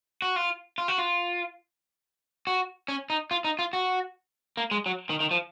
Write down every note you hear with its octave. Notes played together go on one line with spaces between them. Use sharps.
F#4
F4
F4
F#4
F4
F#4
C#4
D#4
F4
D#4
F4
F#4
A#3
G#3
F#3
D#3
D#3
F3